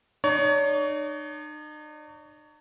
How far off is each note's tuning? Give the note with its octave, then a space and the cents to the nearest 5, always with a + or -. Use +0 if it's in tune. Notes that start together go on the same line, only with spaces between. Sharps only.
D#4 -45 C#5 +30